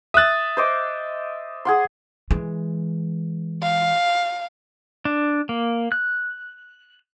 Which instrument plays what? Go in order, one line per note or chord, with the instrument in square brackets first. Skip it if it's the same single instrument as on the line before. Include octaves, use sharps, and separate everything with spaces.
[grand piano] E5 F#6 [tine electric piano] D#6 A6
[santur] C5 D#5 D6
G#4 F#5 C6
[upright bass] E3 G#3
[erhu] F5
[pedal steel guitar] D4
A#3
F#6